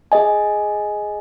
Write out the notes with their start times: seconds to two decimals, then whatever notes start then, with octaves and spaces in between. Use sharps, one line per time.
0.12 G#4 D#5 G#5